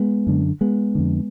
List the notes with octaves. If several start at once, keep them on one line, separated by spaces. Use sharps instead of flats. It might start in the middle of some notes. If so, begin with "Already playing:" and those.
Already playing: G#3 B3
F#2 D3
G#3 B3
F2 D3